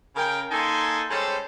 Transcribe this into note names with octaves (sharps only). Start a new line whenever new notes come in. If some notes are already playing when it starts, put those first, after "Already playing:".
C#3 A#4 G5
A#3 D#4 A4 G#5 A5 C6
G3 G#3 C#4 A4 C5